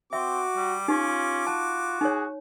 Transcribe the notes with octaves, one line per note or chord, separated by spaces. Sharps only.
C4 F#4 E5 D6
G3
C#4 D#4 F4 G4
F#4 A5
D#4 G#4 C#5